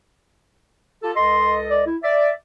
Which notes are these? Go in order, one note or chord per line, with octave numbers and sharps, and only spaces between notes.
F4 G4 A4
C#2 A4 D#5 C6
D5
E4
D5 E5